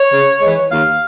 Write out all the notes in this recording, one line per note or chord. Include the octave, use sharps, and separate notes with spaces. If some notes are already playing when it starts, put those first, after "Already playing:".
Already playing: C#5
C#3
E3 G#3
D#2 F5